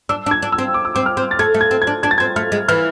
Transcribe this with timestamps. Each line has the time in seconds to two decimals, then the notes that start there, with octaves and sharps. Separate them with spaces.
0.09 D4 E6
0.26 D4
0.31 G#6
0.42 D4
0.52 E6
0.58 C4
0.74 D6
0.85 E6
0.95 C4 D6
1.06 F6
1.17 C4
1.31 A6
1.39 A3 G#6
1.54 A3
1.61 G#6
1.71 C4
1.82 G#6
1.87 D4
2.03 D4 G#6
2.11 A6
2.18 C4 G#6
2.36 A3 F6
2.52 G#3
2.68 E3 F6